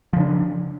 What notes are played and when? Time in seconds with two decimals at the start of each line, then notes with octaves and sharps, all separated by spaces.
0.13 F3
0.17 C#3
0.20 D4